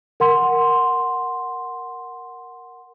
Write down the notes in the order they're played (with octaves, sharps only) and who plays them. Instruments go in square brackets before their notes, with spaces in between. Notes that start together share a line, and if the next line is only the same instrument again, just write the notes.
[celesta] A#4 F#5 C6